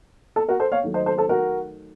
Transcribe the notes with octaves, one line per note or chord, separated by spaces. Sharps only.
A4
F#4 A#4
A4 C5
C#5 F5
D#3 F#3 A3
C5 D#5
A4 C5
A4 C5
F#4 A#4